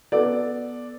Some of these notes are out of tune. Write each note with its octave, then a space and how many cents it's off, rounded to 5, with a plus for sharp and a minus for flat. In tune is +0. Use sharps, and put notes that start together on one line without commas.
B3 -10 A4 -15 D5 +0